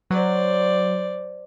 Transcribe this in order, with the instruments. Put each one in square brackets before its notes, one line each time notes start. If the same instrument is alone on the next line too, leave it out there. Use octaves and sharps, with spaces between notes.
[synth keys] F#3 [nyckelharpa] C5 D5